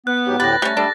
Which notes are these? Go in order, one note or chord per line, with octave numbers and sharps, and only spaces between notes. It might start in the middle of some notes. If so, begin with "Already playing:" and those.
B3 F#6
G#2 F#3 G4
D2 A2 G4 B4 A6 A#6
G3 A3 C#4
G3 D4 A4